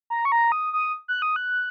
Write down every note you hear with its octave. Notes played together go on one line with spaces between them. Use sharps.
A#5
C#6
A#5
D#6
D#6
F#6
D#6
F#6